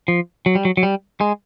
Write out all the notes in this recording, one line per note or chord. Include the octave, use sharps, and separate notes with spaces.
F3
F#3
G3
F#3
F#3
G3
G#3